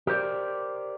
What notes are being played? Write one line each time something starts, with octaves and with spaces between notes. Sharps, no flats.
G4 A#4 C5 D5